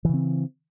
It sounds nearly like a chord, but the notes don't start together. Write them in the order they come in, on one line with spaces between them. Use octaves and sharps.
E3 C#3 C4